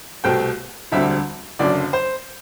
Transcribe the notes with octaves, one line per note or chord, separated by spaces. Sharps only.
C2 B2 A3 C4 G5
E1 D2 D3 G3 C4 E5
F#1 F#2 D3 D5
C5